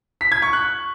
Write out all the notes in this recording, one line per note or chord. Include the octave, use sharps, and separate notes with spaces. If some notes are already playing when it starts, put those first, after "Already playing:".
B6
G#6
C#6
F#6